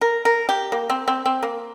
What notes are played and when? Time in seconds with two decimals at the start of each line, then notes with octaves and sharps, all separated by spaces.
0.01 A#4
0.25 A#4
0.49 G4
0.72 A#3
0.90 C4
1.08 C4
1.25 C4
1.43 A#3